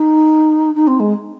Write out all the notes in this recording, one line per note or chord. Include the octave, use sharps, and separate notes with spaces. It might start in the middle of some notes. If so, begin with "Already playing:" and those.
Already playing: D#4
D#4
C4
G#3